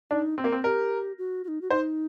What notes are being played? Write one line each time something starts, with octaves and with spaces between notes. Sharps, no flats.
D4 D#4
C4
A#3
C4
G4 A#4
F#4
F#4
D#4
F#4
D#4 C5